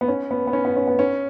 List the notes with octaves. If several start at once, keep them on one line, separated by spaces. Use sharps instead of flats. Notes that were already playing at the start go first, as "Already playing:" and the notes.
B3
C#4
B3
B3
C#4
B3
C#4
B3
C#4